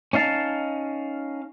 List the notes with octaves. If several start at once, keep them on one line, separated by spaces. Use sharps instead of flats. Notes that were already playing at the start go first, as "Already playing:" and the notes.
C#4 D#4 F5 A5